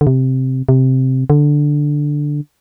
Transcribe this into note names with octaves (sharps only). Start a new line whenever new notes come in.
D3
C3
C3
D3